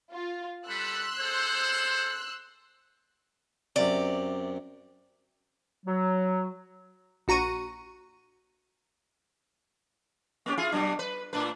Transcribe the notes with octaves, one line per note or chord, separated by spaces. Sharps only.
F4
G3 A4 B5 C6 E6 F#6
G#4 A4 C5
F#2 C3 D5
F#3
A#1 F#4 A#5 C#6 D#7
A#3 C#4 G4
E4 F4 G#4
B2 F#3 D4
B4
A2 D4 B4